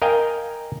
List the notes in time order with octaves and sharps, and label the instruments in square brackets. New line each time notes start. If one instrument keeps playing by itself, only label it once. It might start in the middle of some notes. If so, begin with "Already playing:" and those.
[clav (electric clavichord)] A#4 D#5 F5 G5 G#5